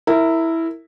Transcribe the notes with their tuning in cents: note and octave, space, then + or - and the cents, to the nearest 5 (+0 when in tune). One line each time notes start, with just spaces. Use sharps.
E4 -5 A#4 -25